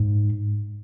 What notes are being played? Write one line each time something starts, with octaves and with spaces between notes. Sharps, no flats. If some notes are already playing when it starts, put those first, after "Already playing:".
Already playing: G#2